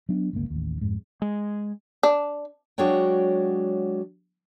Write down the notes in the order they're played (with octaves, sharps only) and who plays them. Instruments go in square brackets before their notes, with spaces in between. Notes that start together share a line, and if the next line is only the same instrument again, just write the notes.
[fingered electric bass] F#3 B3 D4
G1 C#2 A#3
A1 D#2
F2 G#2
G#3
[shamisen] D4
[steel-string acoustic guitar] F#3 G#3 D4 F#4 C#5 G5